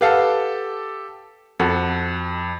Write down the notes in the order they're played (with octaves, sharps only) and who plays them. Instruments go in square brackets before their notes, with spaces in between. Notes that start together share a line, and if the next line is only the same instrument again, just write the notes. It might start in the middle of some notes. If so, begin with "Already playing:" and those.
[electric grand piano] G4 A4 A5 [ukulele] B4 F5 F#5
[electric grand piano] F2 [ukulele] F#4 A4